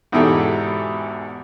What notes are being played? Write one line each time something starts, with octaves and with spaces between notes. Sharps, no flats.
E2 G#2 B2 E4 G4 A4